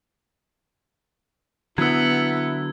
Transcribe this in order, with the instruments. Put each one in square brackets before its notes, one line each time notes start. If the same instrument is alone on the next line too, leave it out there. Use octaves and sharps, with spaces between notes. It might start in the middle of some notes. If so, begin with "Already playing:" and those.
[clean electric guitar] D3 F#3 [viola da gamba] B3 [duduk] E4 [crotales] E6 G#6